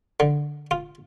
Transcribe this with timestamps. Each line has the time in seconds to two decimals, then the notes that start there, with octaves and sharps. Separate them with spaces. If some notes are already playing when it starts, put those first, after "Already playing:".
0.20 D3
0.71 F4